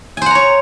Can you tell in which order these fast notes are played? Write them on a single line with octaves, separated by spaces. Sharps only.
G#5 C5 F#5 A#5 C#5